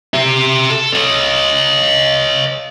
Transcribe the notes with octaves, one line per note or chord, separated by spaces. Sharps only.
G4 E5
A4
C#5 D#5